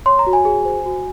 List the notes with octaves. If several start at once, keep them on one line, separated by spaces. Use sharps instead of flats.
C#5 C6
A#5
F#4
G#5
G#4
C5
F#4